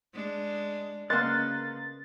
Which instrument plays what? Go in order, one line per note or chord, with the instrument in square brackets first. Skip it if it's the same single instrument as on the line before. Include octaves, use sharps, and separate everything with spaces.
[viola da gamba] G#3 D4
[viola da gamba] C#3 [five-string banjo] A#3 B3 D#5 [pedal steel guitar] A#4 C6 F#6 [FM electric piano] A6